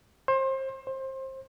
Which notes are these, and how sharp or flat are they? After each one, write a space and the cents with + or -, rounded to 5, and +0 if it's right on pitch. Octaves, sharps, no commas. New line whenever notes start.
C5 +30
C5 +25